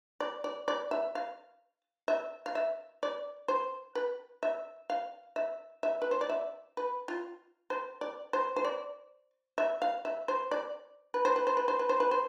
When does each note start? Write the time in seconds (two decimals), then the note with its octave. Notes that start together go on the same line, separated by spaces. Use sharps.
0.20 D5
0.44 D5
0.68 D5
0.91 E5
1.15 F5
2.08 E5
2.46 F5
2.55 E5
3.03 D5
3.48 C5
3.95 B4
4.43 E5
4.90 F5
5.36 E5
5.83 E5
6.02 B4
6.11 C5
6.21 D5
6.30 E5
6.77 B4
7.08 F4
7.70 C5
8.01 D5
8.33 C5
8.56 C5
8.65 D5
9.58 E5
9.82 F5
10.05 E5
10.28 C5
10.51 D5
11.14 B4
11.25 C5
11.36 B4
11.47 C5
11.57 B4
11.68 C5
11.79 B4
11.89 C5
12.00 B4
12.11 C5